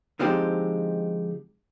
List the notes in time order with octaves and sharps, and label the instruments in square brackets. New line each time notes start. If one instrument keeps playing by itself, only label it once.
[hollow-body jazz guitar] D3 F3 G#3 C4 D#4 G4